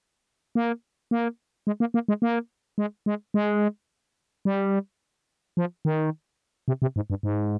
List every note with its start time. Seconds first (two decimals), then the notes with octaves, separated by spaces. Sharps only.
0.55 A#3
1.11 A#3
1.67 G#3
1.80 A#3
1.94 A#3
2.08 G#3
2.22 A#3
2.78 G#3
3.06 G#3
3.34 G#3
4.45 G3
5.57 F3
5.85 D#3
6.68 C3
6.82 C3
6.96 G#2
7.10 G2
7.23 G#2